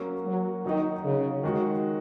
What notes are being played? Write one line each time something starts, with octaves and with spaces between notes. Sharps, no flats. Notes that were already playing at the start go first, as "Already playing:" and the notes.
Already playing: F#3 A#3 C#4 F#4
F#3
D#3 F#3 D#4 F#4
C#3
D#3 G#3 F#4